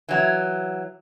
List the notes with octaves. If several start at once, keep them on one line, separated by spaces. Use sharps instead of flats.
E3 F#3